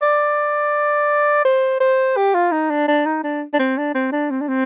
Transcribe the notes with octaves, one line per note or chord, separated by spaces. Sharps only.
D5
C5
C5
G4
F4
D#4
D4
D4
D#4
D4
D4
C4
D4
C4
D4
C4
D4
C4